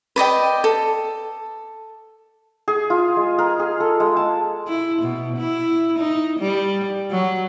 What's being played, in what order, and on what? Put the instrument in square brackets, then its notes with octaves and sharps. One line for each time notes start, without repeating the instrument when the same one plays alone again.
[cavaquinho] B4 D5 D#5 G5
A4
[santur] G#4
F4
G#3
A#4
G#4
A4
G#3
A5
[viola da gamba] E4
B2
E4
D#4
G3
F#3